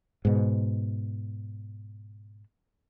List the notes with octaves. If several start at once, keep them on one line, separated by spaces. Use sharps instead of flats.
G#2 B2